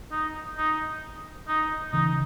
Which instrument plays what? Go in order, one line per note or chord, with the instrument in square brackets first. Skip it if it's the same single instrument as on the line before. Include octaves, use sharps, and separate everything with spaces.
[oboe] D#4
D#4
D#4
[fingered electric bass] C#3 E3 [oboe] D#4